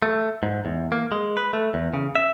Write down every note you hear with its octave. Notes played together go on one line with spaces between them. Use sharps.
A3
G#2
E2
A#3
G#3
B4
A3
E2
C#3
E5